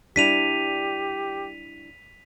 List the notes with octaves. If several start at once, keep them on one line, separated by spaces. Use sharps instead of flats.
G3 D4 E4 G4 B6 D#7 F7